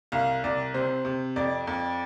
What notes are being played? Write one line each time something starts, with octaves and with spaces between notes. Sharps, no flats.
C2 F5
C2 D5
C3 C5
C3
F2 D5
F2